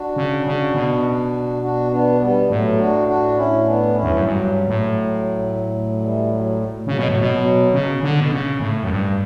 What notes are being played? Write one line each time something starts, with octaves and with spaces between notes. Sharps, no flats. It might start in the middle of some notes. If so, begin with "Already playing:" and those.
Already playing: D4 F#4
C#3
C#3
B2
D4 F#4
B3 D4
G3 B3
A2 F#3 A3
D4 F#4
D4 F#4
C#4 E4
B3 D4
C#4 E4
E2
F#2
G2 F#3
A2
E3 G3
F#3
C#3 F#3
B2
A2
B2
F#3
C#3
D3
B2
C#3
A2
F#2
G2